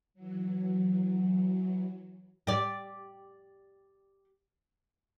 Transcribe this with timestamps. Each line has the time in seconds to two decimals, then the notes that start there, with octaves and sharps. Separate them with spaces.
0.14 E3 F#3
2.47 G4 D5